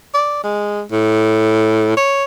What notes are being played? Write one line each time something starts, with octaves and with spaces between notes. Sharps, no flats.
D5
G#3
A2
C#5